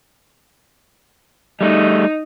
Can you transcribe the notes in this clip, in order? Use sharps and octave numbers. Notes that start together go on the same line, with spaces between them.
G3 A3 D#4